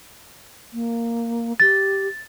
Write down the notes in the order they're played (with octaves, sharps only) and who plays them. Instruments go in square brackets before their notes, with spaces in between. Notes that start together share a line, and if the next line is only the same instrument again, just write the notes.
[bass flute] A#3
[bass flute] G4 [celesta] A6